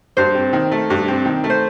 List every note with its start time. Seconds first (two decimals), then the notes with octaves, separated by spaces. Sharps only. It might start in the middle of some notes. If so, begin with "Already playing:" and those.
0.17 G2 C5
0.35 C4
0.53 D#3
0.71 A3
0.90 G2
1.08 C4
1.25 D#3
1.44 A3
1.50 C5